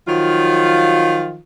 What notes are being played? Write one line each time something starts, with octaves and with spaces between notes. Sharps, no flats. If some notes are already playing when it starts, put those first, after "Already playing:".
D#3 F3 F#3 F4